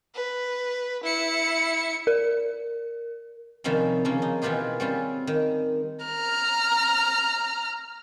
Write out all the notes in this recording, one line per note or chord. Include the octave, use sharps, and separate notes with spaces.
B4
E4 C#7
A#4
C3 D#3 F3 G3 C4 C#4
C#3 F3 A#3 C#4
D#4
B2 D#3 E3 F4 G4 G#4
G3 C4 C#4 F4
D#3
A#5 F6